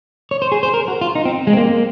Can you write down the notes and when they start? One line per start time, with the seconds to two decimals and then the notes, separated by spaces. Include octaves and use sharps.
0.31 C#5
0.42 C5
0.52 G#4
0.63 C5
0.74 A#4
0.88 F#4
1.01 F4
1.15 D#4
1.25 C4
1.47 G#3
1.53 C4
1.57 A#3